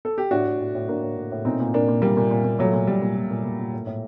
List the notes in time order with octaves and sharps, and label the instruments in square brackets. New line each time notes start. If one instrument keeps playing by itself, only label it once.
[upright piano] A4
G4
A2 D4 F#4
A2
A2
A2
A2 A#3 D4
A2
A2
A2
A#2 C4 D#4
A#2
A#2 A#3 D4
A#2
A#2 G3 A#3
A#2
A#2
A#2
A#2 F#3 A3
A#2
A#2 G3
A#2
A#2
A#2
A#2
A#2
A2
A2